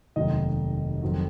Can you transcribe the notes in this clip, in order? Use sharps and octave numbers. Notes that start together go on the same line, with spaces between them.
F1 D#2 D#3 F#3 D#5
F2 D#3 F#3